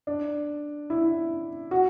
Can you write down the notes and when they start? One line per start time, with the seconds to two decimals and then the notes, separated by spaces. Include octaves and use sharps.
0.07 D4
0.90 E4
1.71 F#4